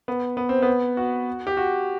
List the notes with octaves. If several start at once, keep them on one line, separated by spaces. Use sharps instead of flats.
B3
B3
C4
B3
F#4
G4
F#4